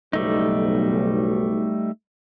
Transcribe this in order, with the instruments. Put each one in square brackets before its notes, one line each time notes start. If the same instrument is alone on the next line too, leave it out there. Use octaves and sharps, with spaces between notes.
[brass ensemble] F#1 B1 [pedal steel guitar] G3 A3 D#4